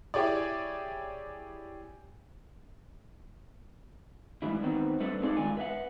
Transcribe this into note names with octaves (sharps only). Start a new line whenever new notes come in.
E4 G4 G#4 C#5 D5
G#2 E3 G3 E4
D#3 B3 C4
G3 A3 C4 D4 A4 B4
G#2 C4 D#4 G#4 A4 D5
E2 C3 D#3 G#3 F4 G#5
B4 E5 F#5